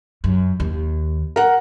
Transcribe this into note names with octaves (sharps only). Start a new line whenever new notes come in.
F#2
D#2
A#4 F#5